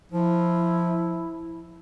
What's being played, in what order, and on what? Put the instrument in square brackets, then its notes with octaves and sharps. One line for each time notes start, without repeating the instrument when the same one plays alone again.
[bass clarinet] F3 [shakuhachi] E4